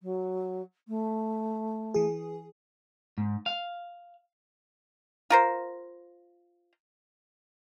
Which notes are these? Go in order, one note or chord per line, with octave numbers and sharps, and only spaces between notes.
F#3
A3
E3 G#4
G#2
F5
F4 A#4 C5